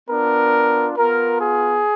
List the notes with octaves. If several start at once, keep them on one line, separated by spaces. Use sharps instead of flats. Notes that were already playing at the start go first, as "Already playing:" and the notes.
B3 D4 F4 A#4
B3 F4 A#4
G#4